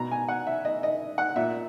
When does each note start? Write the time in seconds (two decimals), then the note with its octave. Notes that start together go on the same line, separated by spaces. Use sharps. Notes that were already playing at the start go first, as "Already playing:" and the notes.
Already playing: B2 A#5
0.11 G#5
0.28 F#5
0.47 E5
0.65 D#5
0.83 D#5
1.18 F#5
1.36 A#2 E5